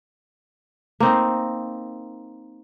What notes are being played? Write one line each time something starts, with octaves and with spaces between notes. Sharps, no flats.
A#3 C4 D#4